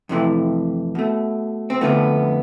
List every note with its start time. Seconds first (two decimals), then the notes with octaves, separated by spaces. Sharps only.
0.09 F2 C3 E3 A3
0.95 B2 A3
1.70 C4
1.81 F2 D3 F3 A3 B3